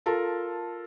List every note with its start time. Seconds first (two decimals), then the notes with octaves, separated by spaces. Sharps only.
0.06 F4 A4 A#4 A5